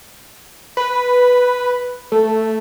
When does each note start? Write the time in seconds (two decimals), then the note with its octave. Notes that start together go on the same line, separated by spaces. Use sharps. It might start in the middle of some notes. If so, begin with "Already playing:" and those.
0.77 B4
2.12 A3